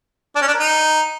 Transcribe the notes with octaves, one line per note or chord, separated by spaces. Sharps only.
D4
C#4
D4
A#4
D#4